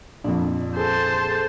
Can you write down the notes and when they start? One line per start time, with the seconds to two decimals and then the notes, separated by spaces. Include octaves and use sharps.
0.24 A#1 F2 D4
0.77 G#4 A4 C5 A5